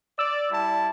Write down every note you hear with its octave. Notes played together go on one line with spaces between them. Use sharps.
D5 E6
G3 E4 A5